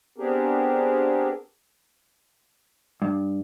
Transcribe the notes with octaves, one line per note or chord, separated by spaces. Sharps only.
B3 C4 D4 G4 G#4 A#4
G2